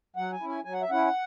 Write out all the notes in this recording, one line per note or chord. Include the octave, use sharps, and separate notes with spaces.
F#3 F#5
G#5
C#4 E4
G#5
F#3 G#5
F#5
E5
C#4 E4 F#5